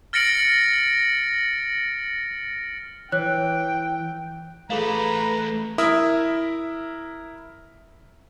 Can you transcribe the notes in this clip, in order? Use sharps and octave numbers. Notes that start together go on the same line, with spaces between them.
F6 A6 A#6 C#7 D7 F#7
E3 C#5 G5 F#6
E3 A3 G#4 A4 B4 F5 A#5
E4 A#4 E5 D#6